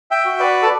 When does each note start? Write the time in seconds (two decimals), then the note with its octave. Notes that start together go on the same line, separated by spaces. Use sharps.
0.11 E5 G5
0.25 F#4
0.40 B4 D5
0.62 A4